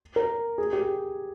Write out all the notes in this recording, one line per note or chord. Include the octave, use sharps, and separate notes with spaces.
A#4
G#4
G4